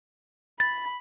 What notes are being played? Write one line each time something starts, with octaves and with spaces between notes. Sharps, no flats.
B5 A6